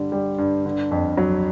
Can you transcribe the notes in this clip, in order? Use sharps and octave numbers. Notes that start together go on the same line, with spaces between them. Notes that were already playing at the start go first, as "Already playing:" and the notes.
Already playing: G2 D3 G3
G3
G2
D3
F2
F#3